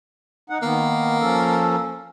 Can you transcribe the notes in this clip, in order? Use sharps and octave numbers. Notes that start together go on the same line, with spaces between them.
D#4 F#5
D#3 A#3 B3
F3 C#4 A4